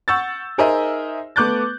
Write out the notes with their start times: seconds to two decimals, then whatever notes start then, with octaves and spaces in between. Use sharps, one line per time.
0.08 F#5 C#6 E6 G6 A6
0.58 D#4 G#4 A#4 C5 D#5 E5
1.36 A3 B3 D6 F#6 G6 A6